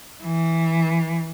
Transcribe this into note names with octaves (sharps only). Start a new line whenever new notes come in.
E3